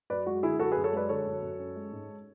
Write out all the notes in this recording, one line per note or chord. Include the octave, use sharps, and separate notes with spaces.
F#2 B4 D5
G#3 F#4
D3 E4 G#4
F#2 F#4 A4
G#4 B4
F#2
A4 C#5
G#3 B4 D5
D3 A4 C#5
F#2
F#2
C#4
G#3
G#2